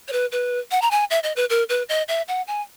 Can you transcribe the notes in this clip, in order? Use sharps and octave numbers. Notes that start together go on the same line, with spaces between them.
C#5
B4
B4
F#5
A#5
G#5
E5
D#5
B4
A#4
B4
D#5
E5
F#5
G#5